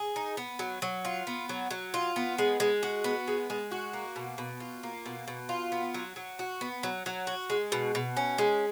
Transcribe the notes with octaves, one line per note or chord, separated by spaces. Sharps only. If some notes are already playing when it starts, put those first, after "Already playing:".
Already playing: G#4
D#4
B3
F#3
F#3
F4
B3
F#3
F#3
F4
B3
G#3
G#3
F#4
B3
G#3
G#3
F#4
A#3
B2
B2
F4
A#3
B2
B2
F4
B3
F#3
F#3
F#4
B3
F#3
F#3
F#4
G#3
B2
B2
C#4
G#3